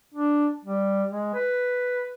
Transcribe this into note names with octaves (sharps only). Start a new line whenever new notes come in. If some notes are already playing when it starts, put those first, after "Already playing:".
D4
G3
G#3
B4